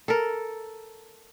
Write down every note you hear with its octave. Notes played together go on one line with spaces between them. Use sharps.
A4 A#4